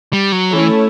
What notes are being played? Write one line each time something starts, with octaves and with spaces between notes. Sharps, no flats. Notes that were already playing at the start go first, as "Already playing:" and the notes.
G3
F#3
E3 A3 C#4 E4 A4 C#5